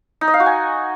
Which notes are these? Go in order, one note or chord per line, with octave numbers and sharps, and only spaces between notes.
D#4
D#5
F5
F#4
G#5